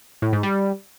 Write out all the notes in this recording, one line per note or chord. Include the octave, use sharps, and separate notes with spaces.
A2
G#2
G3